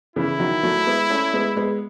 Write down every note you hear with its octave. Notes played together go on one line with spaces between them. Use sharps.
C#3 E3 E4
D#3 F#3
F#3 A3
A3
G#3 B3
A3 C#4
G#3 B3
G#3 B3